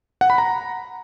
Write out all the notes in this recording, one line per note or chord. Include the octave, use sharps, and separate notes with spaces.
F#5
B5
A#5